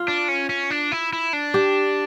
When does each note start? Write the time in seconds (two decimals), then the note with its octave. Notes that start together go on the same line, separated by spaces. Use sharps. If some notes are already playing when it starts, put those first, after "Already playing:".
Already playing: F4
0.08 D4
0.28 C#4
0.50 C#4
0.70 D4
0.92 E4
1.13 E4
1.33 D4
1.54 G4